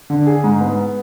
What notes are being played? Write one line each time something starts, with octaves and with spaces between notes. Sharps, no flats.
D3
G#4
G#2
B3